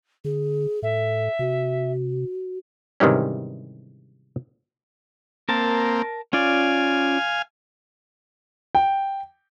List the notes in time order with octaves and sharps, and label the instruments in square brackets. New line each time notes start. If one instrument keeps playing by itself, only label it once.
[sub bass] D3 [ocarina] G#4
[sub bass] A2 [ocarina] A4 [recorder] E5
[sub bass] C3 [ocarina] F#4
[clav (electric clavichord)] G#2 C3 D#3 E3 G3 C#4
[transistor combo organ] A#3 C4 [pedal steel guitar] A#4 A5
[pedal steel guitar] C#4 F4 D5 [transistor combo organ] F5 G#5
[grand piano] G5